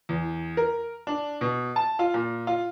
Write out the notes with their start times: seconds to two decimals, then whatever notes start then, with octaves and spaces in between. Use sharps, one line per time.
0.09 E2
0.57 A#4
1.07 D4
1.41 B2
1.76 A5
1.99 F4
2.14 A#2
2.47 F4